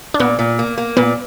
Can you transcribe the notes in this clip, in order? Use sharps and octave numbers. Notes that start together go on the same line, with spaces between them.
D4
A#2 B3
A#2
A#3
A#3
A#2 B3